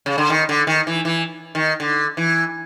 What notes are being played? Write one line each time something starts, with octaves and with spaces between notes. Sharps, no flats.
C#3
D3
D#3
D3
D#3
E3
E3
D#3
D3
E3